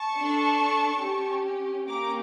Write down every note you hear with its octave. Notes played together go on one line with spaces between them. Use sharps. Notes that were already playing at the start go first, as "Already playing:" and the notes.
Already playing: A5 C#6
D4 A4
C#4 G4
A#3 C#4 G4 A#5 D6